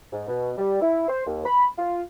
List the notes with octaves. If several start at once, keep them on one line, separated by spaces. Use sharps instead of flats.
G#2
B2
G3
E4
C5
D#2
B5
F4